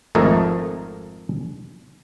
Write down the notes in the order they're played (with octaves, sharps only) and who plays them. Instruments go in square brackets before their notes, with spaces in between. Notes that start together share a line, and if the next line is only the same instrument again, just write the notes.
[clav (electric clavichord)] G#1 F2 A3 D#4 A#4